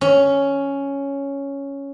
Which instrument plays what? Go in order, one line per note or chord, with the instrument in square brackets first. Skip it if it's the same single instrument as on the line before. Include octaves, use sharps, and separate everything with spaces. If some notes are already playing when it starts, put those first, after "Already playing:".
[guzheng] C#4